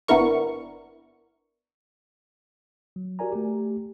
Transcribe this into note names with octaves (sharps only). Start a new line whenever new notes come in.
G1 B3 D4 E4 A#4 C#6
F#3
F#4 G4 A#4 D5 G#5 A#5
A3 G4